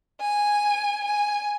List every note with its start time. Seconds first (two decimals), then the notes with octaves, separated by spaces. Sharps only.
0.20 G#5
1.04 G#5